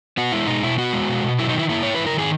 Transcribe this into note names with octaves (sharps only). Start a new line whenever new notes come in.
B3 F#4
G#3 E4
B2 D#4
B2 E4
B3 F#4
G#3
B2
B2
F#3 E4
D#4
D#3 E4
A#3 E4
G#2 C#5
B4
F#3
A#4
D#3 G#4